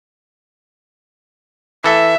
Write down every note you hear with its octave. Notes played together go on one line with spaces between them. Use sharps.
E3 A4 E5